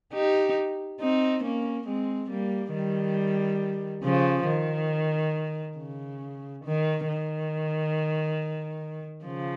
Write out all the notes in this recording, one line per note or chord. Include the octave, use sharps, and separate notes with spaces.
D#4 G4
C4 D#4
A#3 C#4
G#3 C4
G3 A#3
D#3 G3
C#3 F3
D#3
C#3
D#3
D#3
C#3 F3